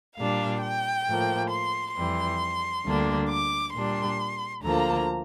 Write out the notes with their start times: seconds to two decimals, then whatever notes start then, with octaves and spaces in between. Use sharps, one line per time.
0.17 A#2 G3 D4 F5
0.62 G5
1.07 A2 F3 A#3
1.51 C6
1.95 F2 E3 G3 C6
2.85 D2 D3 G3 A#3 D4
3.30 D6
3.74 A#2 G3 D4 C6
4.63 D2 D3 F3 A#3 A#5